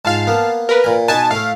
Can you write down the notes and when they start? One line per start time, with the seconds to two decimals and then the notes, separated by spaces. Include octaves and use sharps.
0.05 G#2 F4 F5 A5
0.27 A#3 B3
0.69 A#4 B4
0.84 A#2 G#5
1.08 B2 D#4 B4 G#5 A5
1.31 A2 A3 F5